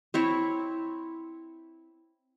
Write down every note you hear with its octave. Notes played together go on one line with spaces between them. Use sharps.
C4 E4 C#5